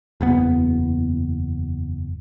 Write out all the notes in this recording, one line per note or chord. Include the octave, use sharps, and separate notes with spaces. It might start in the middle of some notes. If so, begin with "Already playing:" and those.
F#1 E2 B3